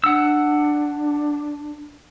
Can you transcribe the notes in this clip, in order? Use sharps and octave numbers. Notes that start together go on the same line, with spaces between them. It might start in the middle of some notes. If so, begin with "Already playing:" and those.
D4 F#5 E6